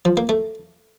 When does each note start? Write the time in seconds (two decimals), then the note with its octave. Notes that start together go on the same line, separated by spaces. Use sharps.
0.05 F3
0.17 A#3
0.29 A3